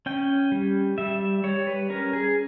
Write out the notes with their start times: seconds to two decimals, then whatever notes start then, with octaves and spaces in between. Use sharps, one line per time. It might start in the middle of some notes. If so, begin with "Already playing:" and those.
0.06 C#4 G5
0.52 G3
0.98 G3 E5
1.44 G3 C#5
1.67 B4
1.90 C#4 A#4
2.13 G#4